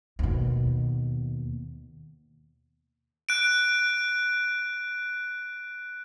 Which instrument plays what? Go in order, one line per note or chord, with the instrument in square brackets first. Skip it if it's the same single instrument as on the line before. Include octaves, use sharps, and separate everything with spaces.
[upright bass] D#2 B2
[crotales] F#6 D7